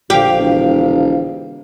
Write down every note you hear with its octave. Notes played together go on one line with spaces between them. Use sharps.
A#1 D3 F4 G4 C5 F5
E1